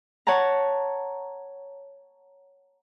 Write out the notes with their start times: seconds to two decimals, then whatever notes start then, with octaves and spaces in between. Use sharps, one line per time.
0.27 C#5 F#5 A5 A#5